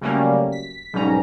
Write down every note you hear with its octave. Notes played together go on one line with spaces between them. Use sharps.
C#3 F#3 G3 A3 A#3 C#4
B6
B1 G#2 G3 C#4 A#5